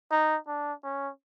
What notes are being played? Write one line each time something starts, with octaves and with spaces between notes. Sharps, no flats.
D#4
D4
C#4